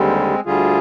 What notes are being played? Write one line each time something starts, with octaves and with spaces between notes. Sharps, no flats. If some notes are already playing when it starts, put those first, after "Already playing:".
Already playing: D#2 D3 G3 G#3 C4
D2 D3 G3 F4 G#4